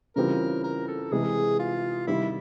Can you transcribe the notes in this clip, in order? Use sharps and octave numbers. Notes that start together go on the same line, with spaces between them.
C#3 E3 G3 C4 F4 A#4
A#4
A4
C3 E3 G#3 G#4
F4
C3 D#3 G3 E4